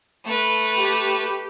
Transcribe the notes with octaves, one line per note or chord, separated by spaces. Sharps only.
A3 B4
G4